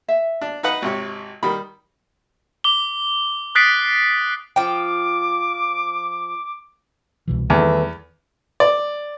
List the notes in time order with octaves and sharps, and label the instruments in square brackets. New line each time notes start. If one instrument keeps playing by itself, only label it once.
[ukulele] E5
[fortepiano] D4
D#4 B4 F#5
G#1 C3 C#5
[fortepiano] D#3 G3 [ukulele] B5
[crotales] D6 G7
D#6 F#6 A6 B6 C7 D7
[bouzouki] F3 G5 [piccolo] D6
[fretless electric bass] C2 B2 E3
[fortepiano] E2 [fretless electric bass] D#3 G3 [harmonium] E3 A3
[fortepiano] D5